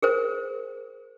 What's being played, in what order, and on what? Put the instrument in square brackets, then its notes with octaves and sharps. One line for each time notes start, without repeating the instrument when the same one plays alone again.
[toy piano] G#4 A#4 C5